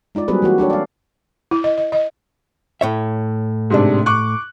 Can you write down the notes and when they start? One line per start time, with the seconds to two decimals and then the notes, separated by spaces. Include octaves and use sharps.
0.15 G#3 D#4 F4 D5
0.28 F#3 G3 A#3 C4 G#4 B4
0.42 E3 A#3 F#4
0.58 D4 G4 A4 C#5
0.70 D5 F5
1.51 E4
1.64 D#5
1.78 D#5
1.92 D#5
2.81 A2 C#5 E5
3.70 G#2 C3 D4
4.06 C#6 D6 F#6